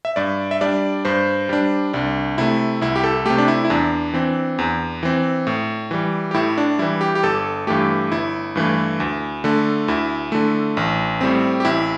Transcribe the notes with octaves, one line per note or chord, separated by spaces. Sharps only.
E5
G2 D5
E5
G3 D4 D5
G2 C5
G3 D4
C2 D4
C3 A3 E4
C2 E4
G4
A4
C3 A3 G4
D4
E4
E4
E2 D4
E3 C4
E2
E3 C4
A2
E3 G3
G4
A2 E4
D4
E3 G3 E4
G4
G4
G1 A4
G2 E3 A3 G4
G1 E4
G2 E3 A3
D2
D3 A3
D2 E4
D3 A3
A1
A2 G3 C4
G4
A1 E4